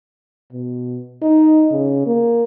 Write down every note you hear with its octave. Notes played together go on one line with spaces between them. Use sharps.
B2
D#4
C#3
A#3